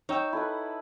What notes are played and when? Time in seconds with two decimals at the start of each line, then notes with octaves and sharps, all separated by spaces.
0.09 D#4 C#5 G5 E6
0.33 E4 A4 B4